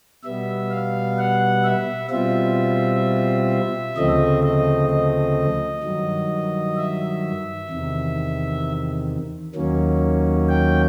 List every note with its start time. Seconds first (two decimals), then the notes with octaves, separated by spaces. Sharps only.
0.23 B2 G3 B3 E5
0.70 F5
1.18 F#5
1.64 E5
2.10 B2 G3 C4 F4 E5
3.96 D2 C#3 F3 A3 C4 D#5
4.43 D#5
4.89 D#5
5.83 G2 D#3 F#3
6.77 E5
7.69 E2 C3 D#3
9.55 D#2 D#3 F#3 A#3 C#4
10.49 G5